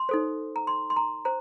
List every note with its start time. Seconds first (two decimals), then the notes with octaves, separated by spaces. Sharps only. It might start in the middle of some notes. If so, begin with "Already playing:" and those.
Already playing: C6
0.09 D#4 A4 C5
0.56 A#5
0.67 C6
0.90 C6
0.97 A#5
1.25 C5 A#5